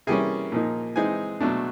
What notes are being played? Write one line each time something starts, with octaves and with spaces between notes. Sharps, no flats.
C3 E3 G3 A#3 C#4 G#4 G#5
A#2 F3 A#3 D#4
E3 G#3 C4 D#4 G#4 G#5
B2 F#3 A3 D4